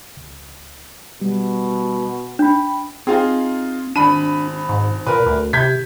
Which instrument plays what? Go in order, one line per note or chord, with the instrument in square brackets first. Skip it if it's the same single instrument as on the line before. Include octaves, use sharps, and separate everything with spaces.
[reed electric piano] C#2
[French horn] B2 [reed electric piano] G3
[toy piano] D4 [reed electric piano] G5 B5
[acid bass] C4 [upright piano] D#4 F4 G#4
[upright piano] G#1 B5 D#7 [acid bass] D4
[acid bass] G#2
[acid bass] A#2 [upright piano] A#4 B4
[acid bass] D2
[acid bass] C3 [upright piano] G6 G#6 B6